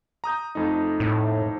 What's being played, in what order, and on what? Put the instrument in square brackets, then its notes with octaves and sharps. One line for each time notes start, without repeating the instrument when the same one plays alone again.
[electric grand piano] A#5 D#6 G6
F2 A3 D#4
[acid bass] A2